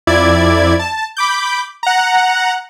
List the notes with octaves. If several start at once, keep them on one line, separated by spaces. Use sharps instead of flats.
F2 E4 D5 G#6
A5
B5 D6 G6
F#5 A#5